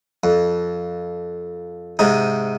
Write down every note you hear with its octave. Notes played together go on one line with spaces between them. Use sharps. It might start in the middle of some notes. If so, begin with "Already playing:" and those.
F2
G#2 C3 D#4